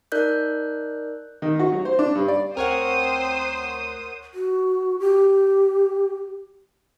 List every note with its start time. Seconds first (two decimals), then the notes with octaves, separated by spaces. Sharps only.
0.12 D#4 A#4 D5 F#6 G6
1.42 D#3
1.59 F#4
1.72 F#3
1.85 C5
1.99 D4
2.15 G2
2.28 D5
2.57 D2 C4 A#4 C5 C#5 F#5 D#6
4.34 F#4
5.00 G4